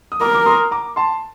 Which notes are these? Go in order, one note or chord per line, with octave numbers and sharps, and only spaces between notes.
D#6
A#4 A#5 D6
D6
C6 D#6
A#5 D6
A5 C6